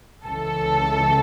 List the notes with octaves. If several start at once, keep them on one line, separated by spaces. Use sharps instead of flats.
C#2 C#3 E3 A4